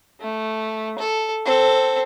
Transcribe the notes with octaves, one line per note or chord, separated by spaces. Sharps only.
A3
A4
C4 A4